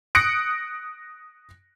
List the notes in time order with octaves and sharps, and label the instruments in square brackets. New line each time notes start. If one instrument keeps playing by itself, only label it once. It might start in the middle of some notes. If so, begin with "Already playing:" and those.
[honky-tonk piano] D#6 F#6 A#6 C#7 D7